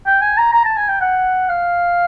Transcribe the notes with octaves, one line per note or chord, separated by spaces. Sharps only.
G5
G#5
A#5
A#5
A5
G#5
G5
F#5
F5